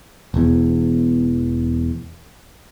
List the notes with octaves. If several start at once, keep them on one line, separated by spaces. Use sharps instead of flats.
E1 E2